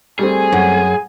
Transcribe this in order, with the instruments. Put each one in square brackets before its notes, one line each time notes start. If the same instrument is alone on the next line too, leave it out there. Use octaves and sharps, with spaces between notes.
[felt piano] G3 A3 C4 [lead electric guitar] G#4 [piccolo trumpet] G#5
[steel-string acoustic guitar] F#2